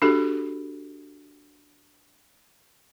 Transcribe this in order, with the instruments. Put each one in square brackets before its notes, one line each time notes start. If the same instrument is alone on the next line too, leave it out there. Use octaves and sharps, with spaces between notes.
[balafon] D4 F#4 G4 A4